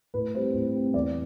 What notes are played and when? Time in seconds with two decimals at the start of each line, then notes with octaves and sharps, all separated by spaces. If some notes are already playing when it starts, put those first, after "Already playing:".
0.14 A2 B4
0.34 G3 C4 C5
0.54 A2
0.74 G3 C4
0.94 E2 D5